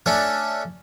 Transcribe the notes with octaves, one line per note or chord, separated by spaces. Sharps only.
A3 C#4 D4